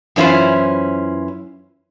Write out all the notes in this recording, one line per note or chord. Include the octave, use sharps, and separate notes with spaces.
F#2 E3 C#4 E4 F4 C5